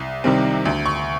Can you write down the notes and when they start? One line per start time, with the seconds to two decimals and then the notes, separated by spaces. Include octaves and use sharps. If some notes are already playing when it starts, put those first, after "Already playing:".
Already playing: C2
0.24 C3 D#3 G3 C4
0.65 D2
0.86 C#6